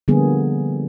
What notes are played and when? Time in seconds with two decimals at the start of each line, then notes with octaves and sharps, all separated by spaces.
0.08 D3 F3 G3 A#3 B3 G#4